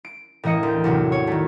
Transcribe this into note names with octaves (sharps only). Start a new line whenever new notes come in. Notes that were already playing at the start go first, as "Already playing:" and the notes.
D7
A2 E3 A#3 D#5 C#7
D2 G5
E2 A2 C3 F#3
C#5
D#3 A3